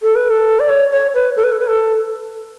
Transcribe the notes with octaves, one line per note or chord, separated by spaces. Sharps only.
A4
B4
A4
D5
C#5
C#5
B4
A4
B4
A4
B4
A4